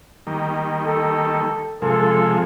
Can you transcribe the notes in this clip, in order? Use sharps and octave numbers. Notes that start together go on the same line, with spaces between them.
D#3 G3 A#3
A4
C3 F3 G#3 A4